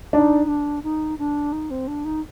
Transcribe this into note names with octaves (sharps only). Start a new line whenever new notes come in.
D4 D#4
D4
D#4
D4
D#4
C4
D4
D#4